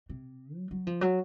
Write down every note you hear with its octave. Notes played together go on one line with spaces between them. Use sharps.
C3
F#3
F#3
F3
F#3